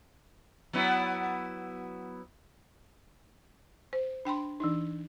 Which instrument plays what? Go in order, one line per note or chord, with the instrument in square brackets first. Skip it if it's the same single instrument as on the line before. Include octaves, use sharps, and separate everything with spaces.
[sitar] F#3 B3 E4
[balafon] C5
D4 G5 B5 C6
E3 D4 D#4